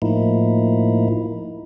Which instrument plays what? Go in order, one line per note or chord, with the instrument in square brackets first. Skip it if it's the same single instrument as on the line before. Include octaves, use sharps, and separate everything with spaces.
[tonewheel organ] A2 F3 A#3 D#4 E4